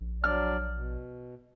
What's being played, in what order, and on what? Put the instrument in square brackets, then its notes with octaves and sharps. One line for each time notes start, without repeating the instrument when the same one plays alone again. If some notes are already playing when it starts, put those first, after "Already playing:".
[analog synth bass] A#1
[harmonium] F#3 D4 D5 [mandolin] F6
[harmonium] B2